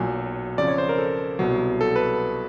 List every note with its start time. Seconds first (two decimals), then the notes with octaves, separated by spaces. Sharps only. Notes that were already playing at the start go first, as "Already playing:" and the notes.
Already playing: B1 A#2 F#3 G#5
0.58 F2 C#3 F3 D5
0.68 C#5
0.78 C5
0.89 A#4
0.98 A4
1.39 C2 B2 F#3
1.81 A4
1.96 B4